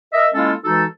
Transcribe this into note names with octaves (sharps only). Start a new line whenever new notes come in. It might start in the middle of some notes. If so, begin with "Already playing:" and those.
A#4 D#5 E5
G#3 A#3 C#4 E4 F4 A4
E3 G#3 D#4 F#4 A4